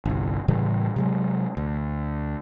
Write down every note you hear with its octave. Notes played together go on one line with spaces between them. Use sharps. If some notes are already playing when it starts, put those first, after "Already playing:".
G1 C2
A2 C#3 E3 G3
C3 F#3 G#3
D2